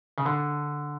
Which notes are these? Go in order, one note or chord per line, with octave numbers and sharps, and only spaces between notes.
C#3
D3